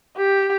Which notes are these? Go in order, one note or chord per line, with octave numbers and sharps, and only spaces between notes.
G4